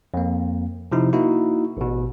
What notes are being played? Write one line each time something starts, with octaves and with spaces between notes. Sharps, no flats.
F2 A#3
C3 F3 D#4 E4
A#3 D#4 E4 F#4
A1 B2